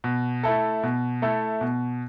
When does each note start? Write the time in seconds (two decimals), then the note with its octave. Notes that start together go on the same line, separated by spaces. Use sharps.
0.04 B2
0.43 A3 E4 A4
0.83 B2
1.22 A3 E4 A4
1.61 B2